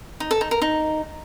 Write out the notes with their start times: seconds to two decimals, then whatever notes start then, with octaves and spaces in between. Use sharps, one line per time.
0.20 D#4
0.31 A4
0.41 D#4
0.51 A#4
0.62 D#4